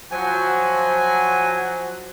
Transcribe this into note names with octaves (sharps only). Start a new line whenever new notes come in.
F3 F#3 F#4 G#5